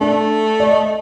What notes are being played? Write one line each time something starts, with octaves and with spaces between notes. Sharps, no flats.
A3 D4
D5
D#5